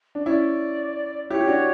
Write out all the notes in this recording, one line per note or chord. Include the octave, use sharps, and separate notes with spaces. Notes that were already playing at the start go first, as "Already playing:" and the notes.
D4
C#4 E4 D5
E4 G4 C#5
G4
D4 F#4